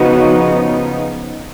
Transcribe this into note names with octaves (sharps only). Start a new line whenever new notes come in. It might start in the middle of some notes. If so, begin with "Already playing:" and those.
Already playing: C#3 F3 B3 D#4 F#4